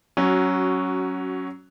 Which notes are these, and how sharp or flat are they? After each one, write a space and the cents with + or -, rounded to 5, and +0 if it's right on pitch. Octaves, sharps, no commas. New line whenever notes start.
F#3 +15 C#4 +0 F#4 +0